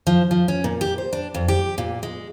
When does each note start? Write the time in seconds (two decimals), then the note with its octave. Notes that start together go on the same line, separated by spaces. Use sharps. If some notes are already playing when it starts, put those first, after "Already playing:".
0.07 F3
0.31 F3
0.48 C#4
0.64 A#2
0.81 G4
0.98 C5
1.13 D4
1.34 F2
1.48 G4
1.78 A#2
2.03 G#3